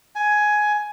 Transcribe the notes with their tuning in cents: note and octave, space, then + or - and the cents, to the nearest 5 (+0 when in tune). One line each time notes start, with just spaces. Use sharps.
G#5 +10